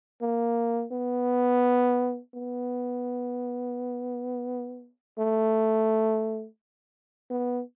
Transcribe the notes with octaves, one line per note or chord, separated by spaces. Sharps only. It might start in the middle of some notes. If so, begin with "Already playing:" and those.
A#3
B3
B3
A3
B3